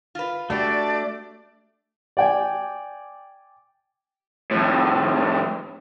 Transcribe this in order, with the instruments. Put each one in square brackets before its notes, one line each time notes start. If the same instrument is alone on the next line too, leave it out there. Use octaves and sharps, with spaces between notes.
[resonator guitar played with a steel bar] F4 B4
[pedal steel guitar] A3 D4 [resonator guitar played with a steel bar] F#4 G4 [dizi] D5
[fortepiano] D5 G5 G#5
[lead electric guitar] F2 A2